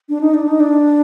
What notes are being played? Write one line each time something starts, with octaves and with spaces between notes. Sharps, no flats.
D4
D#4
D4
D#4
D4